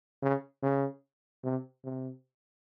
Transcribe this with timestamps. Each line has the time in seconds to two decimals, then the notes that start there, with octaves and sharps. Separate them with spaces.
0.22 C#3
0.63 C#3
1.44 C3
1.84 C3